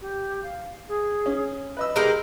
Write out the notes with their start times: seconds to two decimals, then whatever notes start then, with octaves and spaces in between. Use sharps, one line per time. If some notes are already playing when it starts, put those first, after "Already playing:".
0.02 G4
0.43 F5
0.89 G#4
1.26 C#4
1.77 B4 D#5 B5 E6
1.96 G#3 D#4 G4 A#4